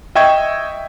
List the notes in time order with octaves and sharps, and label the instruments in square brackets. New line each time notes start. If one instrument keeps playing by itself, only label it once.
[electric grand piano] D#5 E5 G5 C#6 G#6